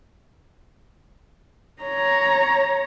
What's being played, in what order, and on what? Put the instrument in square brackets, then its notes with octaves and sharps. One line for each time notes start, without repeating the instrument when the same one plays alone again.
[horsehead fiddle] C#5 A#5